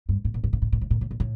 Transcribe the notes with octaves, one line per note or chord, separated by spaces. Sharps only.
G2
A2
A#2
A2
A#2
A2
A#2
A2
A#2
A2
A#2
A2